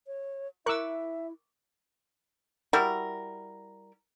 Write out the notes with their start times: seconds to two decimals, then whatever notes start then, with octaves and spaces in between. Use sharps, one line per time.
0.07 C#5
0.66 E4 A#4 E5 C#6 D6 E6 F#6
2.73 G3 E4 F#4 A#4